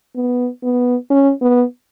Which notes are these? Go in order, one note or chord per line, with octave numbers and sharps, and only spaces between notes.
B3
B3
C#4
B3